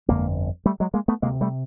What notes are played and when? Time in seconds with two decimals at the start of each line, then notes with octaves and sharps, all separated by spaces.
0.08 G1 F2 D3 G#3 A#3
0.66 G3 A3
0.80 F#3 G#3
0.94 G#3 A#3
1.08 A3 B3
1.22 D2 C3 G#3 A#3
1.41 G3 A3